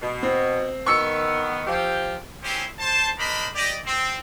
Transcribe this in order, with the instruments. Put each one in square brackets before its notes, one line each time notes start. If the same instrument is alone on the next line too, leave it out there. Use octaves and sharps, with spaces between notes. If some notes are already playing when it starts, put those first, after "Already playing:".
[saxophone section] B2
[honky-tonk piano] C4
[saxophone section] D#3 B3 [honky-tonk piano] C#6 E6 C#7
[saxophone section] F3 G4
[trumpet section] C4 C#4 E4 G4 G#4 C5
C5 A5
D4 A#4 C5 D#5 B5
G4 D5 D#5
C4